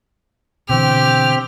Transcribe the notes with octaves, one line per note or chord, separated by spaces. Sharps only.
B2 D3 E3 C4 G4 F6